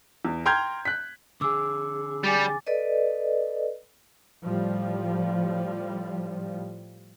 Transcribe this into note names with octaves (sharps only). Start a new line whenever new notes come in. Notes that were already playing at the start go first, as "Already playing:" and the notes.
E2
G5 A#5 C6 F6 G6 G#6
F#6 B6
D3 G#4 D6 E6
G3 G#5 D6 A6
A4 B4 D5 D#5
A2 F3 G3